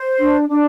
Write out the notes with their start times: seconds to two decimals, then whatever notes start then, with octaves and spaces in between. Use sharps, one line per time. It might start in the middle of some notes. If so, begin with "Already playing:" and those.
Already playing: C5
0.20 D4
0.49 D4